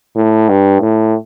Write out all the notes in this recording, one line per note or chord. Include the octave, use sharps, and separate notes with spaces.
A2
G2
A2